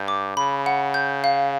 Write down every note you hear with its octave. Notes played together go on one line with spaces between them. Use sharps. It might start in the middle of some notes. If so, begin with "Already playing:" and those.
Already playing: G2 G6
D6
C#3 B5
F#5
G6
F5